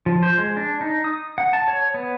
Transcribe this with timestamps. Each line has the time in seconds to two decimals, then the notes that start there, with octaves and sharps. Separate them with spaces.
0.06 F3
0.23 C5
0.38 G#3
0.57 D4
0.81 D#4
1.04 D#6
1.38 F#5
1.53 A5
1.68 C#5
1.94 B3